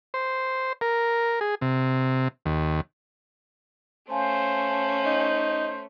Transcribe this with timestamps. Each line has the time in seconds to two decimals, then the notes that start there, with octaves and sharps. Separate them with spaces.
0.14 C5
0.81 A#4
1.41 G#4
1.61 C3
2.46 D#2
4.10 A3 C#4 C5 F5 G#5 A5
5.06 D#4